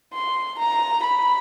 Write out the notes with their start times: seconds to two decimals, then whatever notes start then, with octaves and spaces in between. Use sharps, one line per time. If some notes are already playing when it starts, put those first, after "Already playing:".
0.14 C6
0.59 A#5
1.04 B5